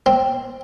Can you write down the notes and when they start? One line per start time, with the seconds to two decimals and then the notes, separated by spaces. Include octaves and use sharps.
0.06 C4